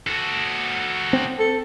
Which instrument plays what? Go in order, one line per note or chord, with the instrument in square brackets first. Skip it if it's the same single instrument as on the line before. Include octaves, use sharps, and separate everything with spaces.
[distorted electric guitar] F#4 A4
[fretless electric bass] C4
[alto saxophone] A4